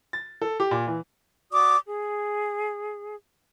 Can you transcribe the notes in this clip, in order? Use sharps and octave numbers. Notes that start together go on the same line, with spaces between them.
A6
A4
G4
A#2
E3
F#4 D5 D6 D#6
G#4